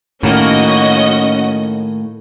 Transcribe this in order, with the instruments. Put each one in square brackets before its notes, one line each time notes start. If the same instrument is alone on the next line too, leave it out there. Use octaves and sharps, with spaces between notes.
[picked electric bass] A2 [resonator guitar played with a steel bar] D#3 A#3 [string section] C#4 F#4 D#5